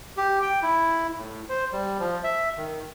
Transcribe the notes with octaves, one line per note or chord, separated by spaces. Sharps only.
G4
G5
E4
A2
C5
G3
F3
E5
D#3